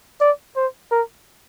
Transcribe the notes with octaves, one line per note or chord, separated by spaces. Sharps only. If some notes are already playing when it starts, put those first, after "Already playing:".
D5
C5
A#4